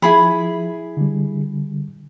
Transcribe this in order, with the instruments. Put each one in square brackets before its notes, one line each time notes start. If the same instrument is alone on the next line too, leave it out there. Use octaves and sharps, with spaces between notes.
[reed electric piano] F3 [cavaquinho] E4 G#4 B5
[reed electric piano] D3 G3